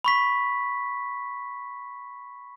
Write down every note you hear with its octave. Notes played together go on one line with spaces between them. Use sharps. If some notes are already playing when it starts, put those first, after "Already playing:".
B5 C#6 B6